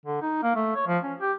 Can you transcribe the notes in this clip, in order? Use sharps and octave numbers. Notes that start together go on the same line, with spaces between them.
D3
D#4
A#3
A3
C#5
F3
C#4
G4